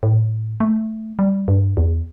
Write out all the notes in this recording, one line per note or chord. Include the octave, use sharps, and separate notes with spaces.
A2
A3
G3
G2
E2